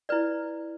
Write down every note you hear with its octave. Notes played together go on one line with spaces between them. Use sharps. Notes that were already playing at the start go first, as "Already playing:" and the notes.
E4 B4 D5